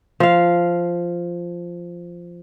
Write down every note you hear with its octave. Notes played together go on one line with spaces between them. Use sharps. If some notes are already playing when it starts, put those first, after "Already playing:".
F3 F5